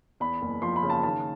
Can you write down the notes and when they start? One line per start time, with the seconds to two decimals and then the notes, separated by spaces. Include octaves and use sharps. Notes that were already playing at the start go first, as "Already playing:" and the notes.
0.20 E2 B5
0.42 F#1
0.62 F3 C6
0.76 B5
0.83 C#3
0.90 A5
1.03 D#3 A5